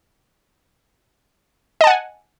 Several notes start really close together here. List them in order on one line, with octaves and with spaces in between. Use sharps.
D#5 A5 F#5 G#5